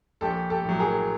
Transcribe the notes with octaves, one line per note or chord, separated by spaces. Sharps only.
A#1 G4 A4
G4 A4
A2 F#3
G#4 A#4